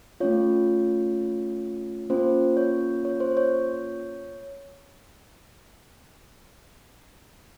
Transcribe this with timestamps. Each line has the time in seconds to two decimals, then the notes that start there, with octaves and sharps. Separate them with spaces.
0.20 A3 C#4 F4 C#5
2.10 A#3 C#4 F4 C5
2.57 C#5
3.05 C#5
3.20 C5
3.37 C#5